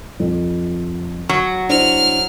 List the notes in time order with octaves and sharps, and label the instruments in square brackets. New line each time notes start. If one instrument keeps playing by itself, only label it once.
[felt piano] F2
[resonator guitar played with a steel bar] F#3 [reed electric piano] C#6
[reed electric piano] D4 E4 [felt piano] C5 [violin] F6